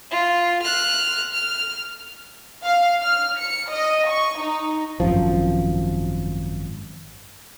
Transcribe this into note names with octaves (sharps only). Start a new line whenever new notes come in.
F4
F6 F#6
F6
F5
F6
C#7
D#5
C#6
D#4
G#1 F#2 F3